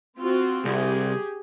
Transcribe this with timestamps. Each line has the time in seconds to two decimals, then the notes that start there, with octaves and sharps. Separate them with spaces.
0.18 C4 F4 F#4
0.65 C2 G4 G#4